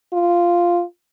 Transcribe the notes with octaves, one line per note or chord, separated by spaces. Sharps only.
F4